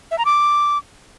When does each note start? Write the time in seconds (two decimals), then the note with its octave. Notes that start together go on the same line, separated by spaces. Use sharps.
0.11 E5
0.18 A#5
0.25 D6